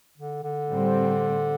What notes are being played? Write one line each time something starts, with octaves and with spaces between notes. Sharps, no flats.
D3
D3
A2 G3 C4